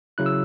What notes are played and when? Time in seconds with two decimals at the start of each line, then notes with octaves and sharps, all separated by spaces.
0.18 C#3 F#3 E4 F#6
0.26 E6